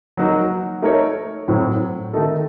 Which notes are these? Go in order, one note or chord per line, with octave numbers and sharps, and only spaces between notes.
F#3 A#3 D#4 F#4 A#4
A3 D#4 A#4 C#5
A2 F#3 C4
D#3 A3 D#4 A4